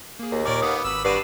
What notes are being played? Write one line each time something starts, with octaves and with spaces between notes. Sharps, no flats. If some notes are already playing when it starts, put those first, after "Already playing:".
A#3 G#4
D#2
A#2 A#4 C#5 D5 C#6 D6
D#3 B3 F5 F#5 B5 D#6
G#1 B4 B5 E6
G2 F#4 D5 C7 D#7 E7